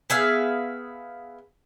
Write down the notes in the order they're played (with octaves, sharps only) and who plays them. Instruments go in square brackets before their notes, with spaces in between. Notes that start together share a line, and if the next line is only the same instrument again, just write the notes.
[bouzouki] B3 G#4 E5 F5